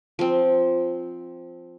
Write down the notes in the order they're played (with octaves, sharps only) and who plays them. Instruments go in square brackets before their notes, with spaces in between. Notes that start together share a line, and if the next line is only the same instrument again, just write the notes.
[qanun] F3 C4